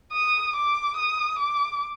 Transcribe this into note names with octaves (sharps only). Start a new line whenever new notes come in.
D#6
D6
D#6
D6